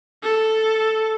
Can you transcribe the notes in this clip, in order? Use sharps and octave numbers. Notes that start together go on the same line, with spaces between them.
A4